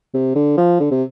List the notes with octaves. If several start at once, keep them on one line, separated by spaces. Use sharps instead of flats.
C3
D3
F3
D3
C3